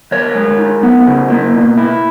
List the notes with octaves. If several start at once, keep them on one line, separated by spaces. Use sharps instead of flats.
D#3 A#4 C#5
G#3
D#4
B3
C#3
A#3
B2
E4